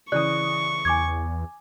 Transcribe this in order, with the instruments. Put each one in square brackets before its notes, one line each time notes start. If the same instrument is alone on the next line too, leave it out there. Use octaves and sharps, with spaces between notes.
[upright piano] C#3 E3 D#6 [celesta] D5 F#6 [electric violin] C#6
[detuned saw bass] E2 [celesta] G#5 D6 G#6